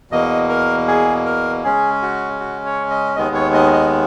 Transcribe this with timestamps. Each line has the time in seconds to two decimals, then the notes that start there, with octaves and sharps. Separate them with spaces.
0.11 E2 B2 A#3 D#5
0.49 A#4
0.87 G#4
1.25 A#4
1.63 C#3 G#3 C#4 G#4
2.02 F#4
2.40 F#4
2.65 C#5
2.90 D#5
3.16 D#2 D#3 G#3 B3 D#5
3.35 C#5
3.54 D#5
3.73 D#5